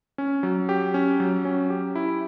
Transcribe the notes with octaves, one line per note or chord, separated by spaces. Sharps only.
C#4
F#3
G4
C#4
F#3
C#4
G4
E4